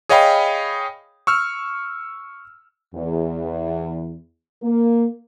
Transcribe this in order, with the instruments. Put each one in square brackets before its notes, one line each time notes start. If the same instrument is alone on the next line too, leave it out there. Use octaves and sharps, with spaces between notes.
[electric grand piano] G#4 C#5 D#5 F5 G5 B5
C#6 E6 F6
[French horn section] E2
A#3